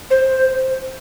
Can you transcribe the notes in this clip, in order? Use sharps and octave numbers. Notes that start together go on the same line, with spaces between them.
C5